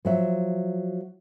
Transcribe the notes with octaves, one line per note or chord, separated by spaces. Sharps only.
F3 F#3 E5